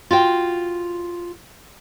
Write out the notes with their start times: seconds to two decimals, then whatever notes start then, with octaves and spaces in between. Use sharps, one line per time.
0.11 F4 F#4 G5